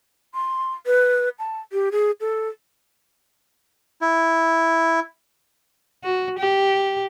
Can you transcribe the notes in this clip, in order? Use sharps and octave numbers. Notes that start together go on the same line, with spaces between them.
C6
B4
A5
G4
G#4
A4
E4
F#4
G4